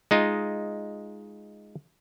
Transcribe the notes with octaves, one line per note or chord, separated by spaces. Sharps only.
G#3 D#4 F4